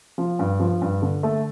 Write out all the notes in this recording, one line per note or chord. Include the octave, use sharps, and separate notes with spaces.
F3
G2
F3
G2
D3
A3